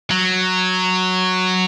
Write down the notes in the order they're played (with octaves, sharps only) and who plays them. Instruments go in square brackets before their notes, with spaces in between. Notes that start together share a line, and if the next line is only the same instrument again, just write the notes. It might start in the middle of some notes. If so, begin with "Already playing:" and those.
[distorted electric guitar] F#3